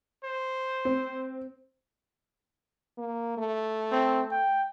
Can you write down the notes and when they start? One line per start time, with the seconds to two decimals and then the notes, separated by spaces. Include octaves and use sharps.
0.24 C5
0.85 C4
2.98 A#3
3.38 A3
3.92 C4
4.30 G5